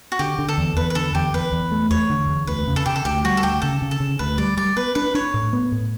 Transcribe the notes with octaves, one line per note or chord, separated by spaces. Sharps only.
F#4
D3 G4
D3
A4
E2
E2 B4
B4
D3 A4
E2 G4
E2 B4
E2
A3
E2 C#5
D3
E2
D2 B4
C#3
A4
C#3 G4
A4
D2 G4
G3 F#4
A4
D2 G4
C#3 A4
C#3
A4
C#3
D2 B4
G3 D5
G3 D5
B3 B4
D4 B4
D4 C#5
A2
B3
A2